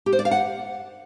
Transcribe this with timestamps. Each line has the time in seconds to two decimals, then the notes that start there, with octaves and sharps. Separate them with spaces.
0.06 G4
0.13 C5
0.19 D5
0.25 F5
0.31 F#5